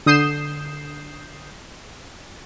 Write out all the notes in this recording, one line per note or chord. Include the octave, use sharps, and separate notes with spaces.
D3 D#6 G6 C7 E7